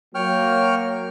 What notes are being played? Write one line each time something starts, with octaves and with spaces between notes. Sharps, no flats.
F#3 A#3 C#5 G5 F6